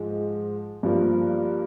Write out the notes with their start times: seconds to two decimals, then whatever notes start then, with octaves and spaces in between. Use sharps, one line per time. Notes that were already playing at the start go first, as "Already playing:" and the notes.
Already playing: G#2 F3 G#3
0.83 G2 F3 A#3